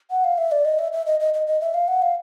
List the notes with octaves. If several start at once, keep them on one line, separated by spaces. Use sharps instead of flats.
F#5
F5
E5
D5
D#5
E5
E5
D#5
D#5
D#5
D#5
E5
F5
F#5
F5